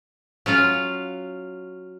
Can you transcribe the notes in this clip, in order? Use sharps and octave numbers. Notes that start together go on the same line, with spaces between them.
F#3 C#4 F4 F5